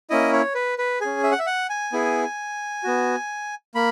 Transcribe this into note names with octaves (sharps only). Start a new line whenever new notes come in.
A#3 C#4 E4 D#5
C#5
B4
B4
C#4 G#4 G#5
E5
F#5
E5
F#5
G#5
B3 E4 G#4
B3 F#4
A#3 B5